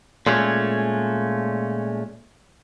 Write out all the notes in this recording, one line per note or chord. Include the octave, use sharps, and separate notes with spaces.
A#2 G#3 A3 C#4